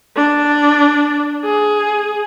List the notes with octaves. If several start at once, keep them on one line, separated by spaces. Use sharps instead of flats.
D4
G#4